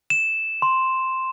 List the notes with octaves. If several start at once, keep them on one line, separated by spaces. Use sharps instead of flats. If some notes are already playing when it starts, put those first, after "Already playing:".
E7
C6